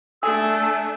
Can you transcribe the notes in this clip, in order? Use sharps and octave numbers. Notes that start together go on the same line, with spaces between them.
A3 D4 G#4 A4 E6